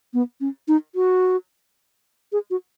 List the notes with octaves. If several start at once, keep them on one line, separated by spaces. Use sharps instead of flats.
B3
C#4
D#4
F#4
G#4
F#4